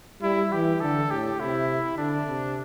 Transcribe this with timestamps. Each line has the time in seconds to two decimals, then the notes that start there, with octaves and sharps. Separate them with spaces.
0.22 G3 E4
0.52 E3 G4
0.81 D3 A4
1.10 A2 G4
1.39 C3 E4
1.98 D3 D4
2.27 C3